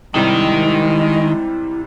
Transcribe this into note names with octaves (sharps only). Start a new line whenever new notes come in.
G#2 C3 D#3 G3 G#3 E4